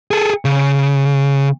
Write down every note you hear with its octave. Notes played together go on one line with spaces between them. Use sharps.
G#4 A4
C#3